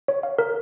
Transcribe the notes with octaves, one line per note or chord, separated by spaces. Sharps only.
C#5
F5
A#4